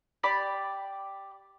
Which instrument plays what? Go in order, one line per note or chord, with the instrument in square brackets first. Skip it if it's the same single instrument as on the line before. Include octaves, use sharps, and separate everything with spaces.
[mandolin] G4 D5 B5